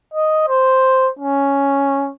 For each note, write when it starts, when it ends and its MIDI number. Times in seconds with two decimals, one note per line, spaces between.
0.14 0.44 75
0.48 1.09 72
1.19 2.11 61